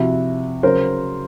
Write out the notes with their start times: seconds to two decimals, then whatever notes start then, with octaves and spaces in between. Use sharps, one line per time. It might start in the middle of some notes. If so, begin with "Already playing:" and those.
Already playing: C3 F3 E4 F#4
0.63 C#3 F#3 A#4 C5